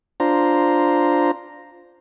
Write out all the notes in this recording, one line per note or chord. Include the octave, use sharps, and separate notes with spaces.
D4 F4 C5 A#5